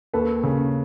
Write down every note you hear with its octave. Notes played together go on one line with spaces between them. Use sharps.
D#2 A4 B4
C#3